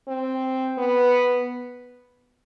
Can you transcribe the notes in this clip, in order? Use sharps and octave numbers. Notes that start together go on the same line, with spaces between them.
C4
B3